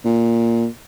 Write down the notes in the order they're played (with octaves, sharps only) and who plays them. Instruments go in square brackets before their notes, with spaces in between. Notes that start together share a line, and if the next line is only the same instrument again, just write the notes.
[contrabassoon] A#2